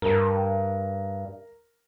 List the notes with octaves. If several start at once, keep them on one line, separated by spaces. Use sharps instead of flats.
G2 A#4 A#5